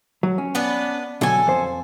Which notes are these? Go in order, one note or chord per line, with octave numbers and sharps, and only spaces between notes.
F#3
C#4
B3 D4 B4
B2 D3 F#3 A4 G#5
F2 C5